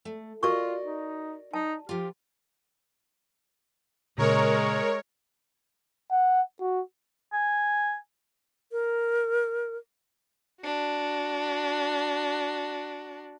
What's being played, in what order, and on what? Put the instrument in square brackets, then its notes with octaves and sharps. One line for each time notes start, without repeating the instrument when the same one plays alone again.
[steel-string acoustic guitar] A3
[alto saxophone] F4 [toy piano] F#4 A#4 C#6 [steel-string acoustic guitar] D5 D#5
[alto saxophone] D#4
[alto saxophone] D#4 [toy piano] A5
[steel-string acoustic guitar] F3 F4 [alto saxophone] G4
[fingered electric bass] A#2 C#3 [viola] G#3 [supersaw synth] A#4 C#5
[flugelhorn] F#5
F#4
[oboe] G#5
[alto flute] A#4
[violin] D4 F#4